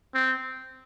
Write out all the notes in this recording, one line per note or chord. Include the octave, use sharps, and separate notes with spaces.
C4